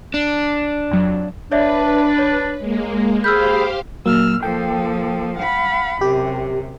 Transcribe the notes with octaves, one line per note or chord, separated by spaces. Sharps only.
D4
F2 F#3
D4 B4 C#5 D5 E5
C#5
G#3 A#3
G4 G#4 C5 F5 B5 E6 F6 G6
A#2 F#3 A#3 E6 F6
F3 A#3 A4 G5
F5 F#5 B5
F#2 C3 G4